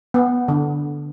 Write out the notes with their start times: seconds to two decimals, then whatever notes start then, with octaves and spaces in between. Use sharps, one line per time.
0.14 B3
0.48 D3